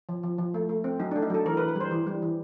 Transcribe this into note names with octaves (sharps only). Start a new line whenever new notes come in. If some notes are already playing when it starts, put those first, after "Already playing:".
F3
F3
F3
A3
A3
C4
F#3 D#4
A3 D4
D#4
F#3 A4
E3 A#4
B4
E3
B4
G3 C5
E3
G3
E3